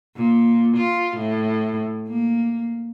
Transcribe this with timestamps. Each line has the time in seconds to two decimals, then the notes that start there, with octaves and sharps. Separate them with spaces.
0.16 A#2
0.77 F4
1.17 A2
2.08 A#3